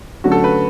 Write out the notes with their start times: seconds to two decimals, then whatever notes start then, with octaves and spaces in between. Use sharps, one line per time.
0.24 D3 F#3 A3 C#4 F#4
0.32 A4
0.44 B4